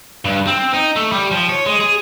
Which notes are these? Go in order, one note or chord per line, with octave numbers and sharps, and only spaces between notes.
G2
C4
D#4
A3
G3
F3
C#5
G#3
G#4